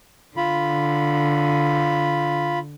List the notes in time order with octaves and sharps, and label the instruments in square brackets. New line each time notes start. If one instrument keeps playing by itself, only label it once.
[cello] D3 [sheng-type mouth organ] F4 B5